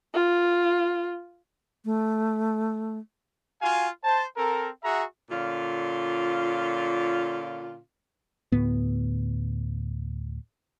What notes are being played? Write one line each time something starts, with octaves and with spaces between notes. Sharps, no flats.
F4
A3
F4 F#4 F5 G#5
C5 A5
C4 A4 A#4
F#4 G#4 E5 F#5 A#5
A#2 D3 C#4 F4
D2 A2 B3